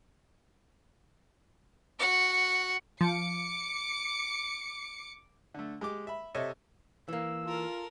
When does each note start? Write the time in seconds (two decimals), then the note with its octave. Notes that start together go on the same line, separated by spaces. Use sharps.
1.99 F#4 F#5
3.01 F3 D6 C#7
5.54 D3 A3
5.81 G#3 G4 D6
6.07 E5 B5
6.35 C3 A4 C#5 D#5 E5
7.08 E3 A#3 E6
7.45 F4 A4 A#4